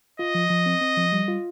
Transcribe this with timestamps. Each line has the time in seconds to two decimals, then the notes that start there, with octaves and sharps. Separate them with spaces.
0.19 F4 D#5
0.35 F3
0.50 F3
0.66 C4
0.81 C4
0.97 F3
1.12 G3
1.28 F4